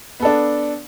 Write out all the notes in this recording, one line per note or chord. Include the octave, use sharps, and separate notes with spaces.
B3 D4 A4